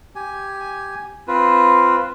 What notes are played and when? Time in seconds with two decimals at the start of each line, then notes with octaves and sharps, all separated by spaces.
0.15 G4 G#5
1.28 C4 F4 B4